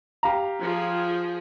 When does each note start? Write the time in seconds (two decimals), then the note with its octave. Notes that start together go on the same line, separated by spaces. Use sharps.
0.23 G4 F5 A#5
0.61 F3 G#4